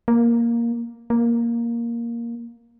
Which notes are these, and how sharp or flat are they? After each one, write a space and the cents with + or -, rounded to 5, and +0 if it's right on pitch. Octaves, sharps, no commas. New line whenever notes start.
A#3 +5
A#3 +5